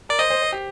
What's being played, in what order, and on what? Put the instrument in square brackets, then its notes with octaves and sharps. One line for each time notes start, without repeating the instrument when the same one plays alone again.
[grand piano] A#4 [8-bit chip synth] D5
[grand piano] C5 [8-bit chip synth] D#5
[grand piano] C5
C5
G4